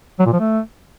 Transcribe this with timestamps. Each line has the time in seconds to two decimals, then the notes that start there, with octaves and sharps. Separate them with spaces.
0.19 F#3
0.26 A#2
0.33 F3
0.40 A3